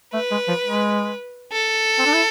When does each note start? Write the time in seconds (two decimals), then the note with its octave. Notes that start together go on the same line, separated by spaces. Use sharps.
0.13 A3 B4
0.31 G#3
0.48 F3
0.65 G#3
1.53 A4
1.98 C4
2.06 D4
2.14 E4